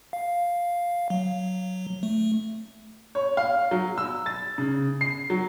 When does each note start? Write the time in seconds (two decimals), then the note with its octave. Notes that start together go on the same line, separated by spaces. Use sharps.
0.13 F5
1.10 F#3
2.03 A3
3.15 C#5
3.37 F5
3.71 F#3
3.98 E6
4.26 A6
4.58 C#3
5.01 C7
5.30 F#3